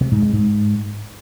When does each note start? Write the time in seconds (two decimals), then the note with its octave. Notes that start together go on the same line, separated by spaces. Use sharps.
0.01 C3
0.12 G#2
0.22 G#3
0.33 G#2